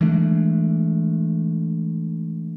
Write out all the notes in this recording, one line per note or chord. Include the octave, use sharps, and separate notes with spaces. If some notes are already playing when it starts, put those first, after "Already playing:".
E3 G#3 A3 D4